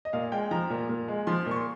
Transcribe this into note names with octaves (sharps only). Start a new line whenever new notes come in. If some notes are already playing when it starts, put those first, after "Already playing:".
D#5
A#2 F5
G#3 G5
F3 A#5
A#2
A#2
G#3
F3 C6
A#2 C#6
C6